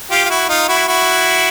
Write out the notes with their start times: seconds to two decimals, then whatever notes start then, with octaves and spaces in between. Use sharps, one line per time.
0.11 F4 G4
0.25 F4
0.30 E4 F#4
0.49 D#4 F4
0.68 E4 F#4
0.88 E4 F#4